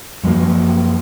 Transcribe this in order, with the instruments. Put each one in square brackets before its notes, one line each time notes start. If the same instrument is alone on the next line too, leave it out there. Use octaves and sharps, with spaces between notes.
[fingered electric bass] F#2 F3 F#3 A#3